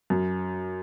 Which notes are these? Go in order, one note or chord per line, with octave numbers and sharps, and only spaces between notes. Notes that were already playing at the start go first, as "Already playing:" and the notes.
F#2